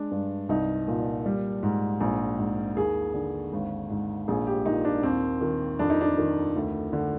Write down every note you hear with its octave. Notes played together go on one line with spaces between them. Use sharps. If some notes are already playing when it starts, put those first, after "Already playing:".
Already playing: G#3 D4
G2
C2 D#4
A#2
G3
G#2
A#1
G#2
D#2 G#4
D3
G#1
G#2
A#1 G#4
G4
A#2 D#4
D4
D#2 C4
D#3
F2 D4
D#4
D4
D#3
D2
D3